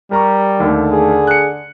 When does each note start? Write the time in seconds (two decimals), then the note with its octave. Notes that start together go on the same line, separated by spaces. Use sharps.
0.11 G3 A#4 A#5 C#6
0.60 D#2 D3 A3
0.91 G#4
1.27 F#6 C#7